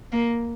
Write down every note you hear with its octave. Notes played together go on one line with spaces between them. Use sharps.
A#3